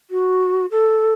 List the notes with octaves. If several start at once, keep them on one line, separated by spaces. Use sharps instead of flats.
F#4
A4